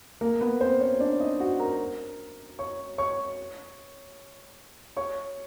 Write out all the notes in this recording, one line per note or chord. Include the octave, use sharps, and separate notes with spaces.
A#3 A#4
B3 B4
C4 C5
C#4 C#5
D4 D5
D#4 D#5
F#4 F#5
A#4 A#5
C#5 C#6
C#5 C#6
C#5 C#6